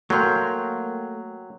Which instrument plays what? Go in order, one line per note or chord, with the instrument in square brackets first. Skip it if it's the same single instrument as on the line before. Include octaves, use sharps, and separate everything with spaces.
[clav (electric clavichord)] F#3 [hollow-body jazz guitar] A3 A#3 [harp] G5 C6 F6